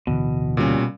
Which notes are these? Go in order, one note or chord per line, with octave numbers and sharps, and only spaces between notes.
D1 B2 D3 E3
A#2 G3 C#4